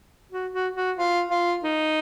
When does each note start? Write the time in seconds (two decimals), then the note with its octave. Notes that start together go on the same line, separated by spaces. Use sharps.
0.32 F#4
0.53 F#4
0.76 F#4
0.98 F4
1.31 F4
1.64 D#4